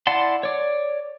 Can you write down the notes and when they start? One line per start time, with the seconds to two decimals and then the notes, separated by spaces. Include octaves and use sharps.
0.07 E4 D5 F#5 A5 C6
0.43 C#5 D5